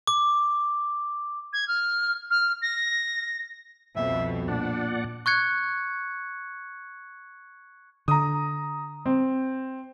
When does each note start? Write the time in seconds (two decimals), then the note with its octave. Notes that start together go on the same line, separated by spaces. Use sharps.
0.07 D6
1.53 G#6
1.68 F6
2.30 F6
2.62 A#6
3.96 C2 F2 B2 E5
4.48 A#2 D4 D5 F#5
5.26 C#6 F#6 G#6 C#7
8.08 D3 A#5 D#6
9.06 C4